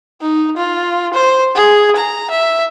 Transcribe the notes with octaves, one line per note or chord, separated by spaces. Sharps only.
D#4
F4
C5
G#4
A#5
E5